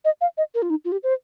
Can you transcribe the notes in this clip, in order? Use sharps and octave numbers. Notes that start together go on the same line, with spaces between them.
D#5
F5
D#5
A#4
F4
D#4
F4
G4
C5